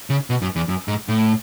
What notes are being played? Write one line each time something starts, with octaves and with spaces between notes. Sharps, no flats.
C#3
B2
F#2
E2
F#2
G#2
A2